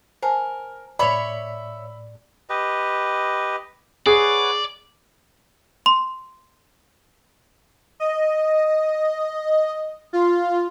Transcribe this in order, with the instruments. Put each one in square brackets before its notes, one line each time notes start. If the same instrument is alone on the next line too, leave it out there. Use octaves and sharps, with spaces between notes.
[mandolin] A#4 [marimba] C5 G#5 A5
[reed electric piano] A2 D5 [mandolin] C#5 E5 [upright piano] B5
[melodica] G4 B4 D#5
[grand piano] G#4 [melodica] B4 C#5 F#5 [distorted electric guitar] D5
[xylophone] C6
[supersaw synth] D#5
F4